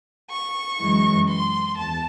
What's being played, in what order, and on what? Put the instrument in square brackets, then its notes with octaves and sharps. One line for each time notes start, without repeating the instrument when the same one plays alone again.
[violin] C#6
[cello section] F#2 E3 G#3
[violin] C6
[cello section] E2 [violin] A5